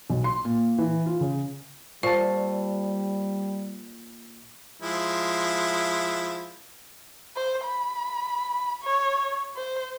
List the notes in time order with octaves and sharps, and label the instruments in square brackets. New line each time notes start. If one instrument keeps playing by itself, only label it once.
[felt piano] B1
C6
A#2
E3
F4
C#3
[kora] A#2 A4 [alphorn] G3 [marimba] C5 C#6
[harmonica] F3 G#3 E4
[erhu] C5
B5
C#5
C5